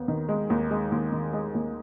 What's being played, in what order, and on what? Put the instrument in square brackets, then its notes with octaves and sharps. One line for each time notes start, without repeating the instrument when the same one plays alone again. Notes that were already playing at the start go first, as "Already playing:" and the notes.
Already playing: [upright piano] D#2 B3
D#3
G#3
D#2
G#3
D#2
D#3
G#3
D#2